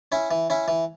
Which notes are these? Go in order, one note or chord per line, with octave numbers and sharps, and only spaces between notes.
C#4 E4
E3
C#4 E4
E3